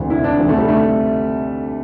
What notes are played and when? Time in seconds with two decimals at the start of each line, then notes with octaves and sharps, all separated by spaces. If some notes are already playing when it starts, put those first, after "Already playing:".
Already playing: E1 D2 C3 E3
0.10 E4
0.24 D4
0.39 D2 C3 E3
0.49 A3
0.58 G3
0.68 A3